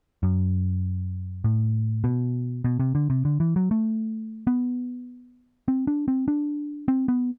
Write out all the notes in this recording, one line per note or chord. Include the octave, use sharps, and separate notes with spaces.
F#2
A2
B2
B2
C3
D3
C3
D3
E3
F#3
A3
B3
C4
D4
C4
D4
C4
B3